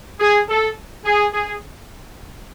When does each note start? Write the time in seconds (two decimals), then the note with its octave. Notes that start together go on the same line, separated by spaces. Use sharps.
0.20 G#4
0.49 A4
1.05 G#4
1.33 G#4